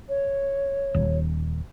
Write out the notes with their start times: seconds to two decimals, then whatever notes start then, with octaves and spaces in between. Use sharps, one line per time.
0.08 C#5
0.94 D#1